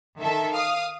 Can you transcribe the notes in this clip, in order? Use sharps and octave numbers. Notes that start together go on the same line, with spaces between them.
D#3 A4 E5
F5 D#6